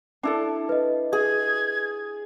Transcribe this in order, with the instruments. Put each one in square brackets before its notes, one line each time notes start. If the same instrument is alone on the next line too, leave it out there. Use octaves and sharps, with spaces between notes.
[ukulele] D4 E4 A4
[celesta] B4 D#5
[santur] G#4 [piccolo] G#6